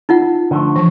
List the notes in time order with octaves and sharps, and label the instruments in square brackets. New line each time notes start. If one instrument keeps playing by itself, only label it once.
[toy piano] D#4 F4 F#5
[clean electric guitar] D3 F3 A3
[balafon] E3 F3